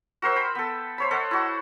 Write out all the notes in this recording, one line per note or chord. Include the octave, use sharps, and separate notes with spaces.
F#4 A#4 C5 E5
G5 B5
B3 A4
C5 C#5 B5
A4 D#5 F#5
E4 F#4